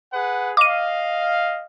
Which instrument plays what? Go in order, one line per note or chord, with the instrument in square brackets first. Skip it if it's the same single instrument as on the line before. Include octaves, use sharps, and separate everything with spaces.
[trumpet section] G#4 B4 F#5
[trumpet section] D#5 F5 [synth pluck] D6 D#7